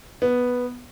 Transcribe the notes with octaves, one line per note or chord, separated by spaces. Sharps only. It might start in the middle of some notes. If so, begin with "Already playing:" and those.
B3